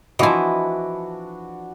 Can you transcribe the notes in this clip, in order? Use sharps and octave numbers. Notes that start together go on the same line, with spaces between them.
E3 F3 D4 E4 F#4 D#5